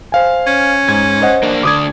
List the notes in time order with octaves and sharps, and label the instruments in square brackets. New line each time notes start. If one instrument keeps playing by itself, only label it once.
[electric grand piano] C5 F5 G#5
[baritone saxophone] C#4
[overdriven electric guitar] G#2 [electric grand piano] G#6
[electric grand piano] C5 D#5 F#5
[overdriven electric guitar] A#3 D4
[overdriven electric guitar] D2 D4 [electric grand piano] D6 D#6 G#6